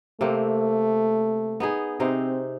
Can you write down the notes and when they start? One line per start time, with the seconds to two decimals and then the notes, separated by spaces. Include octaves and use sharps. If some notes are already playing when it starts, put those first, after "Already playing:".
0.21 C3 A3 A#3 C4
1.60 B3 D#4 G#4
2.00 C3 C4 D#4 C5